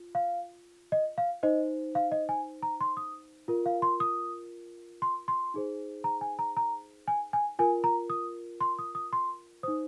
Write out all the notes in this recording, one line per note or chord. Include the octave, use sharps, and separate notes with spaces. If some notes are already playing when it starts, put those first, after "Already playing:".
Already playing: F4
F5
D#5
F5
D#4 C5 D#5
F5
D#5
G#5
A#5
C6
D#6
F4 A#4
F5
C6
D#6
C6
C6
D#4 G#4 C5
A#5
G#5
A#5
A#5
G#5
G#5
F4 A#4 G#5
A#5
D#6
C6
D#6
D#6
C6
D#4 C5 D#6